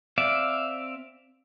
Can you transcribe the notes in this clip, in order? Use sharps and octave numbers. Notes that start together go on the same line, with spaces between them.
C4 D5 E5 F5